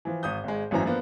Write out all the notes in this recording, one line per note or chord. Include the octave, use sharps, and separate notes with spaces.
E3 F3
G#1 D#6 G6
G#1 G#3
G#1 F#2 A2 E3 C4 A#5
F3 A#3 B3 D4